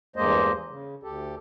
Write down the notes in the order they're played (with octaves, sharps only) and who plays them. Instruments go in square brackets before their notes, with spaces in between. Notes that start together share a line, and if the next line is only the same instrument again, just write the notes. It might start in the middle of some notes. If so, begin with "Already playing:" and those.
[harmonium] E2 G2 G#3 A#3 C5 D#5
C#3
D2 G4 A4